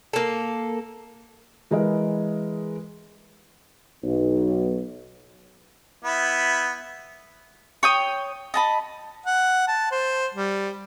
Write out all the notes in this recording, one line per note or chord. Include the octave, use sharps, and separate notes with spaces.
A#3 A4
E3 G#3 A#4 B4 D#5
B1
B3 E4
C#5 G5 D#6
D#5 A5 B5
F#5
A5
C5
G3